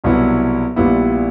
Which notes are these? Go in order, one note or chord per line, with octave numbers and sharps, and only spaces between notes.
C2 B2 F#3 B3 E4
A#1 A#2 G3 B3 E4